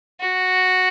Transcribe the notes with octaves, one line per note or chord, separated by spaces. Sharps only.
F#4